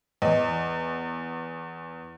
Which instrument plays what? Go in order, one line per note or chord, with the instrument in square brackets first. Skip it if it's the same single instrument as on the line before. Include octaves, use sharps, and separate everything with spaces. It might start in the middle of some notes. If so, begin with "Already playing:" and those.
[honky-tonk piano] E2 [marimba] D#5